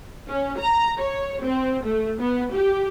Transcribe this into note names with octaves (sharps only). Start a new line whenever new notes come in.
C#4
A#5
C#5
C4
A3
B3
G4